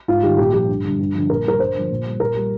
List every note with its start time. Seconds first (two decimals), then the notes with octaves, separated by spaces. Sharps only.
0.08 G#2 F4
0.23 D#3 G3 G4
0.38 A#2 G4
0.53 F3 G4
0.69 G2
0.84 D3 G3
0.99 G2
1.14 D3 F3
1.30 A#2 A#4
1.44 G3 A#4
1.60 G2 C5
1.74 D3 F3
1.90 A#2
2.05 G3
2.20 A#2 A#4
2.35 G3